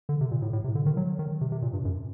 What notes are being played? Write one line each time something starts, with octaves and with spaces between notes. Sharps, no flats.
D3
C3
A#2
A2
A2
C3
D3
D#3
F#3
D#3
C3
C3
A#2
G2
F#2